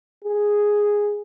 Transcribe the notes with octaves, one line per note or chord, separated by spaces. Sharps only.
G#4